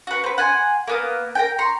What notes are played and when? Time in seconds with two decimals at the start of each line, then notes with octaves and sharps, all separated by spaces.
0.07 F#4 B4
0.24 C4 B4
0.38 F#5 G#5 A5 C6
0.88 A#3 B3 D#6
1.35 A#4 B4 G5
1.58 A#5 C6 C#6